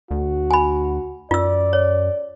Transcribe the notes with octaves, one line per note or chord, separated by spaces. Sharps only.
D2 F#4
G#5 B5
F#2 F4 D5 E6
C#5